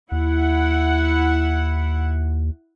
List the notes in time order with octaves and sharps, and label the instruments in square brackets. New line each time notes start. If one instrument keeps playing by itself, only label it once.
[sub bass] D#2 [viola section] E4 F#5